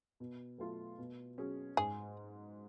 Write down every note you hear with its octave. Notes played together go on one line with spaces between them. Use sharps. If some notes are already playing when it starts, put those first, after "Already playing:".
B2
F#3 A3 F4
B2
F#3 C#4 G#4
G#2 G#4